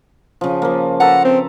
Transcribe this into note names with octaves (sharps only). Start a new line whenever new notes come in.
C#3 F3
F3 A#3
A4 B4 F#5 A#5
C4